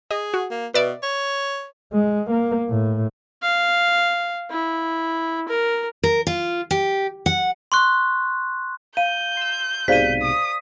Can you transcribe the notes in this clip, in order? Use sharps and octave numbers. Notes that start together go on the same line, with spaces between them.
G#4 D#5
F#4
A#3
B2 B4 D5 E5
C#5
G#3
A#3
A2
F5
E4
A#4
A#4
F4
G4
F#5
C6 C#6 F#6
F5 G6 D#7
C6 E6
B1 G#2 C3 C5 D5 F5 B6 D#7
D#6